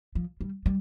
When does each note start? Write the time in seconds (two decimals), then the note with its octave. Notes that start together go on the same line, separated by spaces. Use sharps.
0.15 F3
0.41 G3
0.66 G3